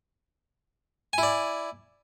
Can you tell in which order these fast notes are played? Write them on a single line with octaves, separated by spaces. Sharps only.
G#5 E4 D5